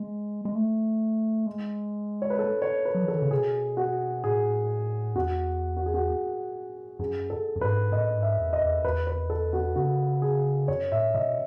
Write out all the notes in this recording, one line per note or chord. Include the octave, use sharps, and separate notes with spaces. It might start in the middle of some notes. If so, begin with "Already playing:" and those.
Already playing: G#3
G#3
A3
G#3
C#5
B4
A4
C#5
B4
F#3
E3
D#3 A4
C#3
B2 G#4
F#4
A2 G#4
E2 F#4
F#4
G#4
F#4
F#2 G#4
A4
F#2
G#2 B4
A2 D#5
G#2
E5
E2
D#5
E2
E2 B4
B4
A4
F#4
C#3 F#4
G#4
F#2 C#5
A2 E5
B2 D#5